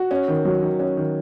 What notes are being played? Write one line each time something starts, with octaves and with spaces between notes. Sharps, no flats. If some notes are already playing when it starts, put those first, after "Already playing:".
Already playing: F#4
C#4
D#3
F#3
D#3
C#4
D#3